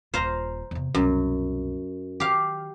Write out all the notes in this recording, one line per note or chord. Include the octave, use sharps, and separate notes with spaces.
D#1 F4 C5 F5 A#5
E2 C3
C2 F#2 B2
D#3 G4 F5